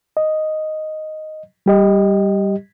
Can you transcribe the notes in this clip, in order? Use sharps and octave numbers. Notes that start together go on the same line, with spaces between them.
D#5
G3 G4 D#5